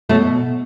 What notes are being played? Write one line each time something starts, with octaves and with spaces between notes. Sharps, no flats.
B2 F#3 A3